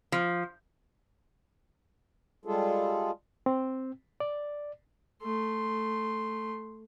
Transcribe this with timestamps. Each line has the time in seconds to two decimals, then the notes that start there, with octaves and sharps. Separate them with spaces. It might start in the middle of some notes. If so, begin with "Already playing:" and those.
0.12 F3
2.45 G3 G#3 F4 G#4 A4
3.46 C4
4.20 D5
5.23 A3 C6